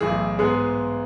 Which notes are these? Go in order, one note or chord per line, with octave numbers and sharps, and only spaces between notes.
B1 A2 E3 G#4
G#2 G#3 B3 G#4